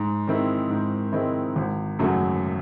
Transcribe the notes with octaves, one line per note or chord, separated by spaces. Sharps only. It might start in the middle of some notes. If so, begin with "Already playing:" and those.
Already playing: G#2
D#3 G#3 C4 E4
G#2
D#3 G#3 C4 E4
G#1
F#2 C#3 F#3 A3